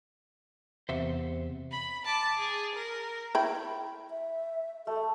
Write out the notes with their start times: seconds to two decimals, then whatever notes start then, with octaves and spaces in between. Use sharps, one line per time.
0.89 E2 C3 C5 E5 F#5
1.71 B5
2.05 A5 D6
2.37 G#4
2.75 A#4
3.35 E4 G5 B5
4.10 E5
4.87 A3 A4